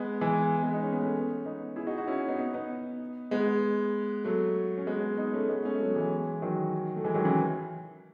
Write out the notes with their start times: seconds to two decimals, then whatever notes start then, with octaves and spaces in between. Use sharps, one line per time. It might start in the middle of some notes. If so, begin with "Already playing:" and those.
Already playing: G#3 B3
0.21 E3 G#3
0.63 G#3 B3
0.74 D#4
0.83 C#4
0.93 B3
1.02 A3 C#4
1.45 B3 D#4
1.76 E4 G#4
1.87 D#4 F#4
1.98 D#4 F#4
2.08 C#4 E4
2.28 B3 D#4
2.39 B3 D#4
2.54 B3 D#4
3.31 G#3 B3
4.25 F#3 A3
4.78 C#4
4.87 G#3 B3
5.18 B3 D#4
5.34 A3 C#4
5.49 G#3 B3
5.65 A3 C#4
5.74 G#3
5.80 F#3 A3
5.96 E3 G#3
6.42 D#3 F#3
6.96 A3
7.04 E3 G#3
7.14 D#3 F#3
7.25 C#3 E3